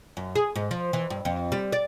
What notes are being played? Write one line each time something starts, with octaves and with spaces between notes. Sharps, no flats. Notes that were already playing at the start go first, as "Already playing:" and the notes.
F#2
G#4
G#2
F3
E3
G2
F2
G3
D5